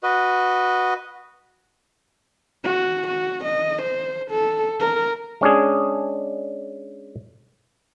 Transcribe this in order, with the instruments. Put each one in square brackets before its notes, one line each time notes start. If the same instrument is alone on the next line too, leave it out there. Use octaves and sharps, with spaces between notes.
[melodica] F#4 B4 D#5
[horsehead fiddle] F#4
F#4
D#5
C5
A4
A#4
[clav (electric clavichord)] G#3 C#4 D4 G#4